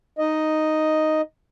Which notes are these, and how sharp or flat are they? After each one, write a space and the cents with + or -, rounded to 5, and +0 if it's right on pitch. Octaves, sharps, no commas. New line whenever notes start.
D#4 +0 D#5 +0